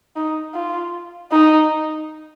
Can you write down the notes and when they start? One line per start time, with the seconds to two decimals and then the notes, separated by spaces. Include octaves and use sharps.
0.16 D#4
0.54 F4
1.31 D#4